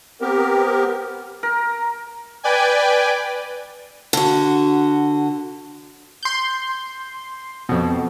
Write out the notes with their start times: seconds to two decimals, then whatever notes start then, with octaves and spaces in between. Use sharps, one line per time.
0.21 B3 C4 G4 A#4
1.43 A#4
2.43 B4 D5 G5 G#5
4.13 D3 F#4
6.23 C6 G6
7.69 F2 B2